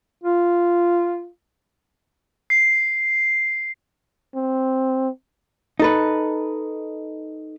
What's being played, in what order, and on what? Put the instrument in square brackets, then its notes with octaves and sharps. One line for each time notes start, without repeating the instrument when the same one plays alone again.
[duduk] F4
[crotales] C7
[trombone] C4
[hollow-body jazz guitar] D#4 A4 B4